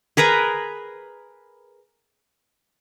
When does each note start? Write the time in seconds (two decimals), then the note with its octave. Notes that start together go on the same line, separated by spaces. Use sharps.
0.17 G#4 A#4 B4 A#5